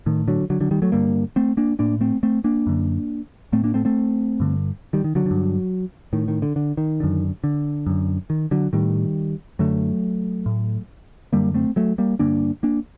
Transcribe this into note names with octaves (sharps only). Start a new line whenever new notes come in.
A2 D#3
D3 F#3
D3 F#3
D3 F#3
D#3 G3
F#3 A3
G2 D3 G3 A#3
A3 C4
A#3 D4
A2 A#3 D4
A3 C4
A3 C4
A#3 D4
F#2 D3
A2 A3 C4
A#3 D4
A3 C4
A3 C4
G2 D3
D#3 G3
D#3
D3 F#3
D3
G2
A2 D#3
D#3
D3
D3
D#3
F#2 D3
D3
F#2 D3
D#3
D3 F#3
A2 D#3 G3
F#2 D3 F#3 A3
A2
F#2 D3 G3 A#3
A3 C4
F#3 A3
G3 A#3
G2 D3 A#3 D4
A#3 D4